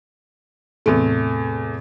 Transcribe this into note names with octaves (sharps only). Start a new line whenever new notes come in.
E2 A2 C3 A3 C4